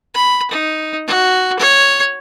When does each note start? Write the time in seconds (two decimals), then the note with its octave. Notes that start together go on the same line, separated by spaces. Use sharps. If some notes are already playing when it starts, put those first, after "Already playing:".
0.14 B5
0.51 D#4
1.07 F#4
1.59 C#5